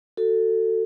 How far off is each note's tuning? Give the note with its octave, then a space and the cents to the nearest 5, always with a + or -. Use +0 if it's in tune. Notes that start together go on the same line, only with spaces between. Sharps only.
F#4 +0 A4 +20